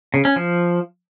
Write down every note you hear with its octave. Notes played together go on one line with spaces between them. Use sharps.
C#3
C#4
F3